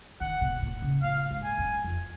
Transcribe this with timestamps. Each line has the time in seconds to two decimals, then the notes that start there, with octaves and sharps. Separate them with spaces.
0.20 D#3 F#5
0.41 B2
0.62 A#2
0.82 C#3
1.03 A#2 F5
1.31 G#2
1.44 G#5
1.58 F#2
1.84 F2